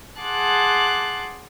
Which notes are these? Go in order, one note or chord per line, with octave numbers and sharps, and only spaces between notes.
G#4 F#5 A5 C6 D6 F#6